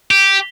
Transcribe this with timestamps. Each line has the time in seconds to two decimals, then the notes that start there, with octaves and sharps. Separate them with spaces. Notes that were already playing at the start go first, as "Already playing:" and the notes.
0.11 G4